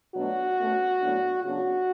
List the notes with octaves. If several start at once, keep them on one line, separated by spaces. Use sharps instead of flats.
B2 F#3 A3 D4 F#4
B2 A3 C#4
A2 F#3 B3 D4
C#3 F#3 B3 D4 F#4